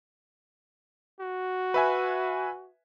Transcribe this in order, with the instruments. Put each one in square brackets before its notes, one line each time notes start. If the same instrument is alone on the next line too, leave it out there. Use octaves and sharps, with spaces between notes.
[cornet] F#4
[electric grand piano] B4 E5 G#5